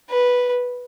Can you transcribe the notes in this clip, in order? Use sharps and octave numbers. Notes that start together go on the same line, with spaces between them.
B4